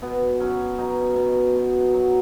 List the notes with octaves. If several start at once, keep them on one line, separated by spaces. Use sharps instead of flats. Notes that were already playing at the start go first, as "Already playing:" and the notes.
B2 B3
F#3 C#4
B2 D#4
B2
B2
F#3